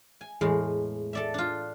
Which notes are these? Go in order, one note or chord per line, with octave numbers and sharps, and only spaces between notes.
G#5
E2 A2 G#3
A4 D5 E5
D4 F4